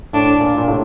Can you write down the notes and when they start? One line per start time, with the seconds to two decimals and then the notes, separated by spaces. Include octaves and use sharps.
0.13 A2 D4
0.40 A#2
0.58 A#2
0.68 A2 C3